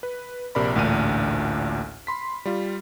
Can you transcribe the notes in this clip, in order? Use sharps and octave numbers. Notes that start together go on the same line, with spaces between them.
B4
A#1 C3 A#4 D5 B5
A1 D2 A#2 D4 F6 D#7
B5 C6 B6
G3 F4